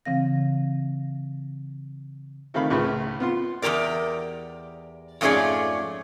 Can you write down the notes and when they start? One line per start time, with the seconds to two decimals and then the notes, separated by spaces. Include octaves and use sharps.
0.05 C#3 E3 C4 F5 A#6
2.54 C3 D#3 A3 F5 B5
2.70 C#2 A2 C#3 B4
3.20 B3 F4 C6
3.62 E2 G3 G4 A#4 D5
5.21 F2 G#2 A3 C#4 G#4 D5